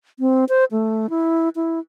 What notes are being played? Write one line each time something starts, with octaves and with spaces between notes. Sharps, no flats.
C4
C5
A3
E4
E4